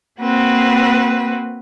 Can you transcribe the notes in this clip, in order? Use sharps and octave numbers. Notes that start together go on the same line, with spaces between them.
A#3 C4 F#4 B4